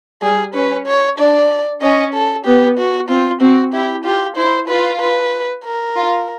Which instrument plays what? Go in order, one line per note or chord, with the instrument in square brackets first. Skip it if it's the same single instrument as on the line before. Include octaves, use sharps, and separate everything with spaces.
[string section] G3 [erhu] G#4
[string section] C#4 [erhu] B4
[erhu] C#5
[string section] D4 [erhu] D5
[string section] C#4 [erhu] D#5
[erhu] A4
[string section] B3 [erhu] G4
[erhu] F#4
[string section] C4 [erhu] F4
[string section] C4 [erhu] F#4
[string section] E4 [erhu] G4
[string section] F4 [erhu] G4
[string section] E4 [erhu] C5
[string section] F4 [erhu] B4
[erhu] B4
A#4
[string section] F4